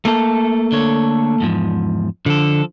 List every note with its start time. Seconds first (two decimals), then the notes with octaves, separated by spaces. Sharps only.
0.05 A3 A#3 A4
0.72 D3 C#5
1.40 E2 G#2 F3
2.26 D3 F3 A4